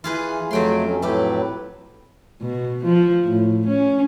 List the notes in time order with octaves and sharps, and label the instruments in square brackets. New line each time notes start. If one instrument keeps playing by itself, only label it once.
[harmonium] E3 [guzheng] F4 G#4 B4
[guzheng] F2 G5 C6 [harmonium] F#3 A3
[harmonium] F#3 C#4
[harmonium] A2 F#3 B4 [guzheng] A3 G4
[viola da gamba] B2
F3
A2
C#4